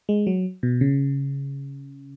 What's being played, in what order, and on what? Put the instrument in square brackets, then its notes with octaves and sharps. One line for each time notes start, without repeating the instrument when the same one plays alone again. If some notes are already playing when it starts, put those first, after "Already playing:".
[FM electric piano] G#3
F#3
B2
C#3